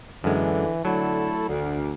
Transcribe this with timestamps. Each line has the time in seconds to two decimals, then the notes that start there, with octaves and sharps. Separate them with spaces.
0.24 F#2 D3 E3 G#3
0.85 D3 F#3 A3 E4 A4
1.48 D2 D3